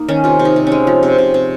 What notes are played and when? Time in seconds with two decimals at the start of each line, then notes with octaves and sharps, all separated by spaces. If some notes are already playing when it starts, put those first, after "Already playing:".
Already playing: A#3 D#4
0.08 D#3 C#4
0.24 C3 F4
0.39 C3
0.45 D#4
0.56 C3
0.67 G#3 C#4
0.87 F3
1.03 C3
1.18 C3
1.34 C3